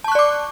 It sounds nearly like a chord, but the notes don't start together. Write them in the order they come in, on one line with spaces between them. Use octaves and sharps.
A5 C#6 F#6 D5 D6